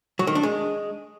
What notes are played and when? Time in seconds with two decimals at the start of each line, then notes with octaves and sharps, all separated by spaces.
0.19 F#3
0.27 D#3
0.35 D4
0.43 G#3